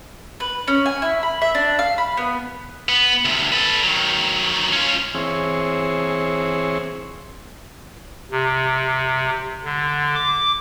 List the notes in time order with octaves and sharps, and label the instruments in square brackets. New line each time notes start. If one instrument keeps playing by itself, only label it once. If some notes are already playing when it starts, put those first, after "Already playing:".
[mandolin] B4
C#4
G#5
E4
B5
E5
D4
F5
B5
B3
[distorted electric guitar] B3
D2 C3
A4 B4
D#3 F#3
C#4 F4
[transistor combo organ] E3 C4 G#4 C#5
[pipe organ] C3
D3
D6